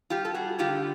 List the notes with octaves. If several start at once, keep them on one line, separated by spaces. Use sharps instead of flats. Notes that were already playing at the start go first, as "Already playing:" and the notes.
G3 F4 G4
A4
G3 F#4 G#4
D3 F4 G4